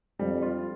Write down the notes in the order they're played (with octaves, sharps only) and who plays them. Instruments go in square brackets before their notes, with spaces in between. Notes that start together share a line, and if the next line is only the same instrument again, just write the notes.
[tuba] F2 [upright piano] G3
[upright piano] F4